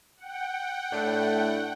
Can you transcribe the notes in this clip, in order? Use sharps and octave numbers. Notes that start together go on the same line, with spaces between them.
F#5 G5
A2 A3 D4